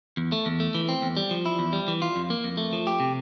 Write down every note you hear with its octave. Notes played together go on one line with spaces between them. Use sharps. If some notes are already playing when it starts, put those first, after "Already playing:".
E2
A3
E2
A3
E3
C4
E2
G3
F3
E4
E2
G3
E3
F4
F2
A#3
F2
A3
F3
G4
C3